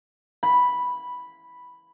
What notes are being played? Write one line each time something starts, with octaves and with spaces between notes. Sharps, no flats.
B5